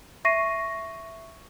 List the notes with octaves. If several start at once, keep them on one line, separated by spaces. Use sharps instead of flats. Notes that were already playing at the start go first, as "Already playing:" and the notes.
E5 C#6 A#6 C7 D#7